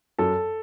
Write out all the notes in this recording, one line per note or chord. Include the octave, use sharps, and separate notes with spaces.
F#2 A4